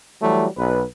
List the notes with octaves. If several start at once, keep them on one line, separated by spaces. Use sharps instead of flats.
E3 F#3 G3 A3
B1 B4